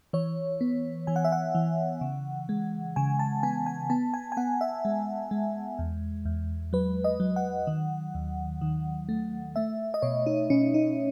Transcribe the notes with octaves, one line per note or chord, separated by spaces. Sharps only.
E3 C#5
B3
E3 G#5
F#5
E5
F#5
E3
C#3
G#3
C#3 G#5
A5
B3 G#5
G#5
B3 A5
G#5
G#5
B3 F#5
E5
G#3
G#3
E2
E2
F#3 B4
D#5
F#3
F#5
D#3
D#2
D#3
A3
A3 E5
D#5
B2 C#5
D#4
B2 C#4
D#4